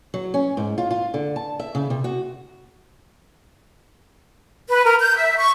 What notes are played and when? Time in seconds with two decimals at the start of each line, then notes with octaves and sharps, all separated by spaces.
0.14 F#3
0.34 C#4
0.57 G#2
0.78 F4
0.91 F4
1.14 D3
1.36 A5
1.60 E5
1.75 C#3
1.90 C3
2.04 F#4
4.69 B4
4.85 A#4
5.01 G6
5.17 E5
5.38 C#6